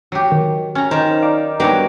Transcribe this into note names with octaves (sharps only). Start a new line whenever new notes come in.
F#3 G4
D#3
C#4 A#5
D#3 D#4 C5 C#5
D5 F5 D6
F#3 G3 A#3 B3 D4 F#4 G4